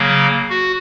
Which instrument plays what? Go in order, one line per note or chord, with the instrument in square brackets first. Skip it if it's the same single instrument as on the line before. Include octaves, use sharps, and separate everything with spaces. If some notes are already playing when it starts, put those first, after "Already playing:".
Already playing: [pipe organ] C#3 F#3 A#3
F#4